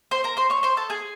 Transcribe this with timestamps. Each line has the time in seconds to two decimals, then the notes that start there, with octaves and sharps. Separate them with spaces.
0.11 C5 C6
0.24 A#4 A#5
0.37 C5 C6
0.50 C#5 C#6
0.63 C5 C6
0.77 A4 A5
0.90 G#4 G#5